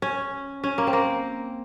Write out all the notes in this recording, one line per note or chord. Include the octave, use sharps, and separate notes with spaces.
C#4
C#4
A#3
C4
A#3